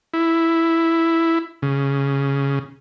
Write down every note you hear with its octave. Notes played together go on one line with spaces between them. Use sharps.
E4
C#3